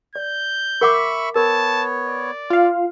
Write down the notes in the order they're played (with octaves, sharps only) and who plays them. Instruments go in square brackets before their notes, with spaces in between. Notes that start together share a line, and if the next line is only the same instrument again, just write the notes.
[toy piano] D5 [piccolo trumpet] G6
[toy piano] A#4 F#5 D6 [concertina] E5 B5 C#6
[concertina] B3 C#5 [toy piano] A#4 [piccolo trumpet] A5
[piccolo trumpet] D5
[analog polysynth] F4 F5